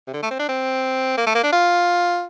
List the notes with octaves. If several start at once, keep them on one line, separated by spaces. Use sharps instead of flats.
C3
D3
A3
C4
D4
C4
A#3
A3
A#3
D4
F4